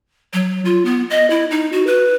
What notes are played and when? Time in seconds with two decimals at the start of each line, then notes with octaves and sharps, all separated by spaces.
0.33 F#3
0.65 F4
0.85 B3
1.10 D#5
1.30 E4
1.51 D#4
1.72 F#4
1.87 B4